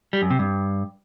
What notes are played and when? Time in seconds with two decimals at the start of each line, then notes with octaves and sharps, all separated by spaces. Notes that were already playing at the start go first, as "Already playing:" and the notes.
0.13 G3
0.22 F#2
0.30 C3
0.39 G2